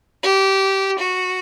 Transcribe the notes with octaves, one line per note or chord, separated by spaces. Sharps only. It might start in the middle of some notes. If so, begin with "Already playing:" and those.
G4
F#4